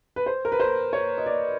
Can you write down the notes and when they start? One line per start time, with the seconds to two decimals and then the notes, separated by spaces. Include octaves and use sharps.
0.16 B4
0.26 C5
0.45 A#4
0.52 B4
0.60 C5
0.93 C#5
1.18 D#5
1.26 D5